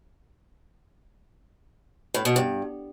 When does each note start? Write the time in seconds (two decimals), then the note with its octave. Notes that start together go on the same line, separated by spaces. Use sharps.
2.14 A2
2.25 B2
2.36 G2